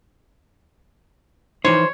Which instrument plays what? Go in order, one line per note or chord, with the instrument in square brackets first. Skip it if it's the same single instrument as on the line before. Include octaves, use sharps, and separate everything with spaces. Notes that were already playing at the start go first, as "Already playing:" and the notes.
[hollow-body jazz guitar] E3 F3 D#4 [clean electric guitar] C5 [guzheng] C#5